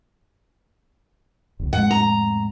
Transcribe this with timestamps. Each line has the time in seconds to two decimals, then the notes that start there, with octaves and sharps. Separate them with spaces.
1.60 F1 C#2
1.73 F2 A2 G#3 F#5
1.91 A#5